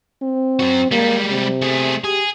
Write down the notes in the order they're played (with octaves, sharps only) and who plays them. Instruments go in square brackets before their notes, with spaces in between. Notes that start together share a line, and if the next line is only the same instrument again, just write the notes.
[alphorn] C4
[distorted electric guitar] F#2 F#4
[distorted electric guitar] G3 G#3 [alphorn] A#3
[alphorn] C3
[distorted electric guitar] A3 G#4
[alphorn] G4 [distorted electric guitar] G#4